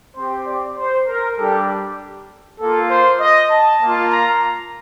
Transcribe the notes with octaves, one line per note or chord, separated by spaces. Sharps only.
C4 G4 C5
D5
C5
A#4
G3 D4 G4 A4
G4
A#3 F4 A4
C5
D#5
A5
A#3 F4
A#5